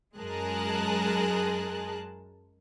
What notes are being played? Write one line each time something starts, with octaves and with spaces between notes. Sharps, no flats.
F#2 G#3 G#4 A#4 A5 F#6